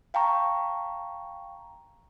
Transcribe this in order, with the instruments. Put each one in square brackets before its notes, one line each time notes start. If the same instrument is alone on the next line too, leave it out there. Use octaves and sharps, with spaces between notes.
[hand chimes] F5 G5 A5 A#5 C#6